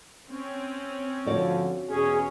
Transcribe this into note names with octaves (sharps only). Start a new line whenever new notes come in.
C4 C#4
G#2 D3 F3 F#4 C#5 D5
E2 B2 C#4 G#4